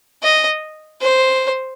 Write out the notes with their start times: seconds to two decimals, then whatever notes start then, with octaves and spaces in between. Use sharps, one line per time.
0.23 D#5
1.02 C5